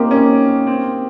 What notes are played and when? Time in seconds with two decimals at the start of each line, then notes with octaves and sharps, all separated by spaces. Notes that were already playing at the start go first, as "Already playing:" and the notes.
Already playing: A#3 C4 D#4 G4
0.11 C#4
0.67 C4